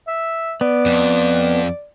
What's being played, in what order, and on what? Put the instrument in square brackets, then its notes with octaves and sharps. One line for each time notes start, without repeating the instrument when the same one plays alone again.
[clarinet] E5
[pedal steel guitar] B3 [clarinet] D5
[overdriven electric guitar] F2